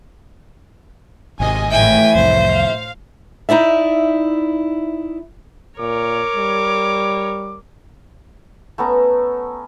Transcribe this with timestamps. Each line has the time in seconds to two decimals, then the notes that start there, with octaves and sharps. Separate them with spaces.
1.40 G#1 C3 D#5 G#5
1.71 A2 E3 E5 G5 G#5
2.15 C2 F2 C5
2.51 F5
3.49 D#4 E4 D5 E5
5.79 A#2 A#4 C#5 D6
6.36 G3
8.78 A3 B3 C#4 A#5